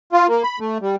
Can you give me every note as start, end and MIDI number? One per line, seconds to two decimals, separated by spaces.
0.13 0.27 65
0.28 0.43 58
0.44 0.59 83
0.60 0.78 57
0.81 0.96 55